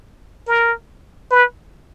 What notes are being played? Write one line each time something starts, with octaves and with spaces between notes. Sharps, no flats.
A#4
B4